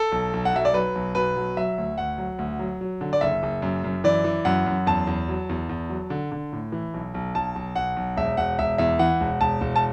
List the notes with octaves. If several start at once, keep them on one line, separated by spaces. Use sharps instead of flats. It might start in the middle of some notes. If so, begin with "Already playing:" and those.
Already playing: A4
B1
B1
F#5
F#3 E5
D5
F#3 B4
B1
B2 B4
F#3
F#3 E5
D2
D2 F#5
F#3
D2
F#3
F#3
D3
D5
F#1 E5
F#1
F#2
F#2
E3 D5
E3
F#2 F#5
F#2
E2 A5
E2
F#3
E2
E2
F#3
D3
D3
A2
E3
B1
B1
B1 A5
B1
B1 F#5
B1
E1 E5
E1 F#5
E1 E5
E2 E5
E3 F#5
E1
E1 A5
E1
A5